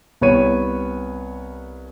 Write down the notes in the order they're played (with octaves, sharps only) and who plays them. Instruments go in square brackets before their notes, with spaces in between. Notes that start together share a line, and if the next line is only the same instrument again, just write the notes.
[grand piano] C2 B3 C#5 D#7